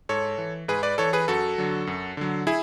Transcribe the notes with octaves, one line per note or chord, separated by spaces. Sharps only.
G#2 A4 C#5
E3
G#2 G#4 B4
B4 D5
E3 A4 C#5
G#4 B4
F#2 F#4 A4
D3 F#3
F#2
D3 F#3
E4 G#4